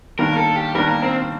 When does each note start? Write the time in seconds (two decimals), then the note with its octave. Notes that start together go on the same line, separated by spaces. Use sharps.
0.19 D#3 G3 A#3 D4 A#4
0.37 A4
0.56 G4
0.75 D#3 G3 A#3 D4 A#4
0.88 A#4
1.02 C4